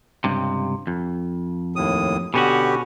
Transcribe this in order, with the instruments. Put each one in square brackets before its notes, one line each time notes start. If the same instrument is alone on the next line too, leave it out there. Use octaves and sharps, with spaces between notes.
[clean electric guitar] C#2 G2 C3
F2
[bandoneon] D#2 A2 D#6
[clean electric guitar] B2 C#4 F#4 [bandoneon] D3 B3 G4